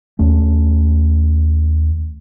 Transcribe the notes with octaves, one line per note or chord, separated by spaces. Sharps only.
D#2 A3 C#4